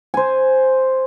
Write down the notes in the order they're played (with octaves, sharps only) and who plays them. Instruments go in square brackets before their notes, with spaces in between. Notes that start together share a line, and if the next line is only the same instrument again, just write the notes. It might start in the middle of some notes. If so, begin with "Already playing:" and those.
[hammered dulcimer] C5 G#5